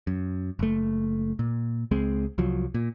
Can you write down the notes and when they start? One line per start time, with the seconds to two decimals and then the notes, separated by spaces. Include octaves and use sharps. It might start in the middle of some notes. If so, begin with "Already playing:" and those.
0.07 F#2
0.59 F#1 A3
1.39 A#2
1.91 C#2 G#3 C4
2.38 C2 F3 F#3
2.74 A#2